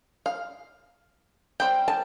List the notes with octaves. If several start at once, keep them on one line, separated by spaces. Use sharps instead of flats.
F5
G3 C4 G5
A5